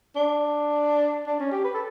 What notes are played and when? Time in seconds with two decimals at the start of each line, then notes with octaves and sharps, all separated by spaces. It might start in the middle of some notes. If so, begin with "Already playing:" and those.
0.16 D4
1.27 D4
1.40 C#4
1.51 G4
1.64 B4
1.74 A4